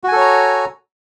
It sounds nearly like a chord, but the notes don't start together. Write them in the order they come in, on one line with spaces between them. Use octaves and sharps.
F#4 G#5 A4 C#5 A#5